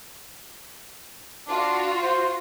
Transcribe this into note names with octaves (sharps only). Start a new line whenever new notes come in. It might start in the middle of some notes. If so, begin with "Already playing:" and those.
D4 F4 F#4
C5